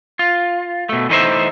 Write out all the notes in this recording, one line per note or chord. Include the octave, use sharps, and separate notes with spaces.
F4
B2 A3
E3 A3 D#4 G4 C5 E5